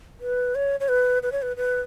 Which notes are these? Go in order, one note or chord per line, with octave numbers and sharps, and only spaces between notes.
B4
C#5
C#5
B4
B4
C#5
B4
B4